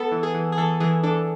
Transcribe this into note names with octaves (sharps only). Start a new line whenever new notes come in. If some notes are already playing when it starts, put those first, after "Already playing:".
Already playing: B3 A4
E3
G#4
E3
G#4
E3 A4
E3 G#4
D4 A4